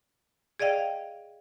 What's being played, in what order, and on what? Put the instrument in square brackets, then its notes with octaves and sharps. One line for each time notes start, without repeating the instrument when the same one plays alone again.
[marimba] G#4 D5 D#5 F5 G5